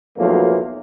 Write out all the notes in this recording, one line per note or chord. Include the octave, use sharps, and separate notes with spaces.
B1 E2 F3 F#3 A3 A#3